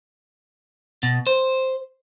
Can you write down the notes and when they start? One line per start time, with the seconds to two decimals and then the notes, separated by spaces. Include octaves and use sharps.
1.03 B2
1.27 C5